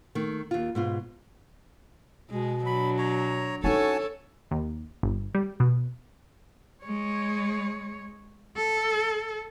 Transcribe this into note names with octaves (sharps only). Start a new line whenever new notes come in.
D#3 A3
D#2 F4
G#2 B2 F4
B2 G#3
F#3 D4 B5
C#5 A#5
C#4 D#4 F#4 A4 C#5 G#5 A5
D#2
G1
G3
B2
G#3 C#5
A4